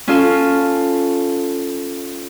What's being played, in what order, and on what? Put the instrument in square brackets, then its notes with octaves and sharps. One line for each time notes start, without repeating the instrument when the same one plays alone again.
[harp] C#4 F4 A4